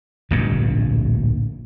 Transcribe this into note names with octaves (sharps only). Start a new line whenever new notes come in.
D1 A#1 G2 B2